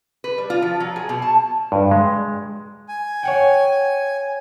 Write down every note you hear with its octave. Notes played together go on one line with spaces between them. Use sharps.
B4
G3
F4
F3
F#3
G#4
B2
A5
G2
G#3
G#5
C#5 F#5 G5